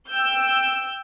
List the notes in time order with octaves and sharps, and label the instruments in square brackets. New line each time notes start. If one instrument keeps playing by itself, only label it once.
[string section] G5 E6 G6